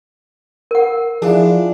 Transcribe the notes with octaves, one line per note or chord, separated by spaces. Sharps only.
A#4 F#5
F3 D4 E4 F4 G#4